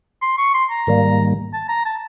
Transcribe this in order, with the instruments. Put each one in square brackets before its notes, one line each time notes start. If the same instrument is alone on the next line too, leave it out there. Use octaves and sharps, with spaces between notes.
[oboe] C6
C#6
C6
A#5
[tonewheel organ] G#2 D#3 G3 A#3
[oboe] A5
A#5
A5